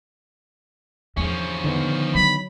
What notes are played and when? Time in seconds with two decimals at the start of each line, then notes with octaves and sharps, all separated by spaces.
1.17 E2 F3 C#4 D4
1.64 D3 D#3 B3
2.15 F#3 B5